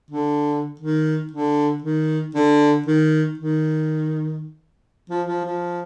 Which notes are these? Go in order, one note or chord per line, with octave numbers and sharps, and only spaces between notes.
D3
D#3
D3
D#3
D3
D#3
D#3
F3
F3
F3